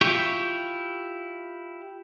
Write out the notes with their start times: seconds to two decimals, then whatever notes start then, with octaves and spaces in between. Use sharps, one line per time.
0.01 E4 F4 G4 C#6